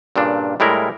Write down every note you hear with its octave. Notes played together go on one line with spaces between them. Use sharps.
G2 A#2 C#3 D4
A2 G3 G#3 E4 A#4